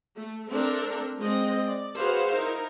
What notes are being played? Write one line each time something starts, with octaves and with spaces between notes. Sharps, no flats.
A3
A3 C4 D4 A4 A#4
G#3 C4 D#5
D5
F#4 G#4 B4 C5 F5
D#4 E4 A#4